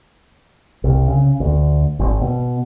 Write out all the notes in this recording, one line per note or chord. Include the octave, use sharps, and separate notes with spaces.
C2
C#3
D2
G#1
B2